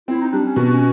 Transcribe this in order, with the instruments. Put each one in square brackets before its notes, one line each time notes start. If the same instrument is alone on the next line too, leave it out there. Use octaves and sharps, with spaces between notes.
[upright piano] C4 [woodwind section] E4
[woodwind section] D#4
[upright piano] G3 [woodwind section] D4
[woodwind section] C#4
[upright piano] B2 [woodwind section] C#4
[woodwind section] D4
C#4